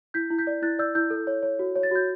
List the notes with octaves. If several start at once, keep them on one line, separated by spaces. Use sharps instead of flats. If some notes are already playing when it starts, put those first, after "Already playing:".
E4 G6 B6
E4
G6 B6
D5
E4 F#6 A6
D5 E6 G6
E4 E6 G6
A4
C#5
C#5
F#4
C#5
A6
F#4 G6